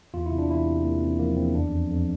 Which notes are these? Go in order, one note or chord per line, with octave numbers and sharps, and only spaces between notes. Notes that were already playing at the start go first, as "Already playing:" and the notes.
E2 F4
C3 E4
D4
E2 E4
C3
C3 A#3
E2 C4
F3 A#3
E2 C4
F2 D4
F2
F2